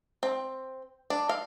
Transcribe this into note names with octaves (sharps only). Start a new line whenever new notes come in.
C4
D4
F5